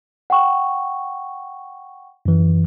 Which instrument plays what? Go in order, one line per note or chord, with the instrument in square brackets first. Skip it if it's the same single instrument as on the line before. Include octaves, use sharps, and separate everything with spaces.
[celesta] F#5 G5 C#6
[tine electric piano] F#2 E3